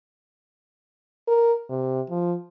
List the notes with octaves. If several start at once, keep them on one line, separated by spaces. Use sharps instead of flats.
A#4
C3
F3